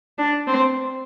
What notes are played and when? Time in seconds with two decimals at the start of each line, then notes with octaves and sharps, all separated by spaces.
0.18 D4
0.47 C4